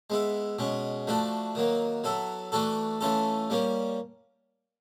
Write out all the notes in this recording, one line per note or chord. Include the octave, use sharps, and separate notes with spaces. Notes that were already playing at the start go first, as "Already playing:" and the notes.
G#3 B3 E4
B2 G#3 C#4
F3 A3 D4 F#4
D#3 F#3 A#3
F#3 B3 E4 A4
E3 A3 D4 F#4 A4
E3 A3 C#4 F4 A4
G3 A#3 C#4